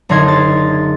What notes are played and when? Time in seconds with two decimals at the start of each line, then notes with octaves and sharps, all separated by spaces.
0.09 F#1 D3 D#4 C6 G#6
0.28 A6